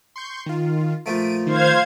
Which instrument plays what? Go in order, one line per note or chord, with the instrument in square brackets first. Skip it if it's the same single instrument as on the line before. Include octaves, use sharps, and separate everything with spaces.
[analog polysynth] C6 C#6 G6
D#3 F4
[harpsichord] A#2 F3 A3 [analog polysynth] D7 D#7
[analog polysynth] D#3 [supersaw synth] C5 F5 G#6